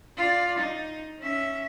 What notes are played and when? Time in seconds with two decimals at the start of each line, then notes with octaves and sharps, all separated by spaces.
0.17 F4 D5
0.58 D#4
1.19 C#4 E5